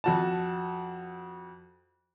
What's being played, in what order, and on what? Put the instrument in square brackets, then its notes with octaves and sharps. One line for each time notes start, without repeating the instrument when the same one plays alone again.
[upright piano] F2 F#4 A5